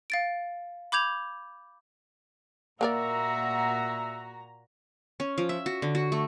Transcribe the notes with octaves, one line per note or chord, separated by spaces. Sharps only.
F5 A6 D7
B5 D6 G6 G#6 F7
A#2 A#3 F#4 A#4 D5 E5 A#5
C#4
F3
E5
F#4
D3
F#4
A3